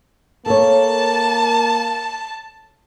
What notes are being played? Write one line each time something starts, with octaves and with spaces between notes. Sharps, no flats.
A#3 A4 C#5 A5